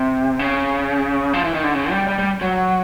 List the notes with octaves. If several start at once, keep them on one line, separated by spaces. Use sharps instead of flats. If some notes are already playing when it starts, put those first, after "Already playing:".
Already playing: C3
C#3
F3
E3
D#3
D3
C#3
G3
G3
G3
F#3